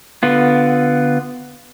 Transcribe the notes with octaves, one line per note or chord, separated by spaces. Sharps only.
D3 B3 F4